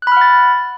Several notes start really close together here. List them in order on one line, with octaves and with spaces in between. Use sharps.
F#6 B5 F6 F#5 A6